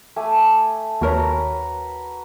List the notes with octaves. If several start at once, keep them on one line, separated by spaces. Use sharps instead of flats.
A3 G#5 D6
D#2 F#4 A#4 B4 C#5 A#5